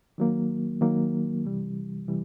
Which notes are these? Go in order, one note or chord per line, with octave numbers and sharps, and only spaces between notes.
D#3 F#3 A#3
D#3 F#3 A#3
C3 E3 G3
C3 E3 G3